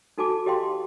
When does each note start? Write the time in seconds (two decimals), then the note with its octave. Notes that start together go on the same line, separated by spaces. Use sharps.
0.18 D#4 F#4 A4 G#5 A5 D6
0.46 G4 D#5 F5 G5 C6